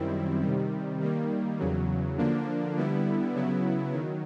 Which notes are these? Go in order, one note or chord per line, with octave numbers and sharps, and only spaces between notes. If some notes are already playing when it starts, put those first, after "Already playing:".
Already playing: F#2 D#3 G3 C4 E4
C3 D#3 G3
D#3 G3 A#3
E2 C#3 F#3
D3 F3 A#3 D4
D3 G3 B3 E4
C#3 F#3 B3 E4
D#3 F#3